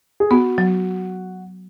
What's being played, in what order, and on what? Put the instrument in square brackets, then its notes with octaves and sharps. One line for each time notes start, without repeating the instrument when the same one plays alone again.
[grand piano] G#4
[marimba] B3 [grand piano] F#4
[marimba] F#3